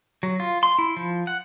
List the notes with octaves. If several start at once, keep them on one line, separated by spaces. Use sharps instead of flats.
F#3
F4
C6
E4
F3
F#5